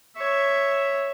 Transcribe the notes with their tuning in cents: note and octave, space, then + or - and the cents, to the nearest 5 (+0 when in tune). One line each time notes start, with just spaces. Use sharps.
C#5 +0 E5 +0